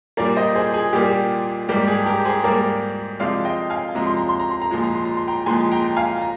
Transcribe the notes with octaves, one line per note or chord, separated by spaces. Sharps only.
A#2 G3 A#3 A#4 D5
C5 D#5
G#4 C5
G#4
A#2 G3 A#3 G4
G#2 G3 A#3 G4
G#4
G4 A#4
G#4 C5
G#2 G3 A#3 A#4 D5
C3 F3 G#3 D5 F5
D#5 G5
F5 G#5
C3 F3 G#3 A#5
C6
A#5
C6
A#5
C6
A#5
A#2 F3 G#3 C6
A#5
C6
A#5
C6
G5 A#5
A#2 F3 G#3 G#5 C6
G5 A#5
F5 G#5
A#5